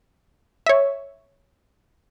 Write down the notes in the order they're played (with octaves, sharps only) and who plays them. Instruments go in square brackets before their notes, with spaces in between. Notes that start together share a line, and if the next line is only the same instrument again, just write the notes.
[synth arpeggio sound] C#5 E5